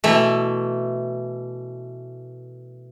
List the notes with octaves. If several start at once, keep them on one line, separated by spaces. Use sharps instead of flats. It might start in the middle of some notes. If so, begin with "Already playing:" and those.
B2 E3 A3